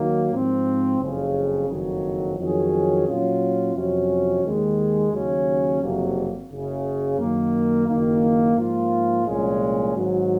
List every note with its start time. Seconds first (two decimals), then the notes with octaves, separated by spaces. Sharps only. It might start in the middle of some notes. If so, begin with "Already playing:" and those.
Already playing: D#2 D#3 F#3 A#3
0.32 G#2 F3 C4
1.00 F#1 F2 C#3
1.69 F#1 F2 D#3 F#3
2.38 F2 D#3 F#3 C#4 G#4
3.07 A#2 F#3 C#4 F4
3.75 F2 C3 F#3 C#4
4.44 D#2 D#3 G#3 D#4
5.13 D#2 C#3 F#3 C#4
5.81 F#1 F2 C3 F#3 A#3
6.50 F#1 F#2 C#3
7.19 F#2 D#3 A#3
7.88 F#1 F#2 D#3 A#3
8.56 G#2 F3 A#3 F4
9.26 C2 A#2 F3 G#3 C#4
9.95 G#1 G#2 F#3